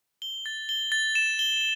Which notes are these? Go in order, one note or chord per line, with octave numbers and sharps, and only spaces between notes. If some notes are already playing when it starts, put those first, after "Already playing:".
G7
A6
G7
A6
E7
G7